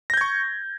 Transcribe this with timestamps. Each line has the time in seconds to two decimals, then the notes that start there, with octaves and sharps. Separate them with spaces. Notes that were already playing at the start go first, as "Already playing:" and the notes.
0.10 A#6
0.14 G6
0.17 G#6
0.21 C#6